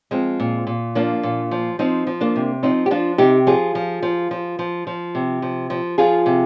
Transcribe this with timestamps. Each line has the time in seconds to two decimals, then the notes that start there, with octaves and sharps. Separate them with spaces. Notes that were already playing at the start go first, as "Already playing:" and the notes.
0.11 F3 G#3 C4
0.40 A#2
0.67 A#2
0.95 F3 A#3 D4
1.23 A#2
1.51 F3
1.79 F3 C4 D#4
2.07 F3
2.21 A#3 D4
2.36 C3
2.63 F3 C4 D#4
2.86 G4
2.91 F3 D4 F4
3.18 C3 D#4 G4
3.47 F3 F4 G#4
3.75 F3
4.02 F3
4.31 F3
4.59 F3
4.87 F3
5.15 C3
5.42 F3
5.70 F3
5.98 F3 F4 G#4
6.26 C3